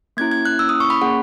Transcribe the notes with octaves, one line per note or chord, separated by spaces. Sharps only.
A#3 C#4 E4 G#6
G#6
F#6
A#3 C#4 E4 E6
D#6
C#6
B5
A#3 C#4 G#4 F#5